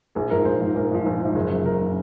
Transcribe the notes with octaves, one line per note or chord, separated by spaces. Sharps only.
A#1 G#4
G#2 F3 A#4
A#1 C5
G#2 F3
A#1 A#4
G#2 F3
A#1
G#2 F3
F#1 G#4
F#2 C#3
F#1 A#4
C#3